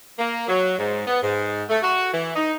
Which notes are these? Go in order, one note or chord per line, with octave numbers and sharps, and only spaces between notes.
A#3
F#3
G#2
B3
G#2
A3
F#4
E3
D#4